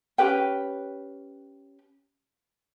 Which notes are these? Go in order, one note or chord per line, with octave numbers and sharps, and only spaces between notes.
C#4 G4 B4 G5